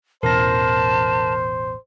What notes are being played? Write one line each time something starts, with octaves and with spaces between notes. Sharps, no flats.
A1 E2 B2 A#4 C5 A5 A#6